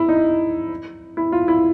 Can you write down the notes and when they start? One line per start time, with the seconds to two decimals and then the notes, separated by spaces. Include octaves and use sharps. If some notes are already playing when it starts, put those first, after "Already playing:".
Already playing: E4
0.09 D#4
1.17 E4
1.32 F4
1.48 E4